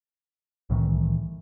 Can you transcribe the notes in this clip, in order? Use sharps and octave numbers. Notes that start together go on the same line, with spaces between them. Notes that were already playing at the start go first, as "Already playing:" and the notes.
C2 A2 D#3 E3